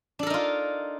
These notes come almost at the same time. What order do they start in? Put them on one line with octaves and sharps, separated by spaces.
D4 A4 A#4 D#4 F4